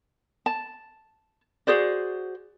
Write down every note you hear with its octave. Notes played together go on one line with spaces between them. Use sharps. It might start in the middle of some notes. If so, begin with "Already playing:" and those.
A5
F#4 G#4 C5 D5